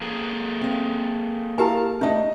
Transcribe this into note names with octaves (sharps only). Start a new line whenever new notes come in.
A#3 G#4 A4
C4 F5
E4 G4 A#4 F5 G#5 A5
A3 D4 D#4 D#5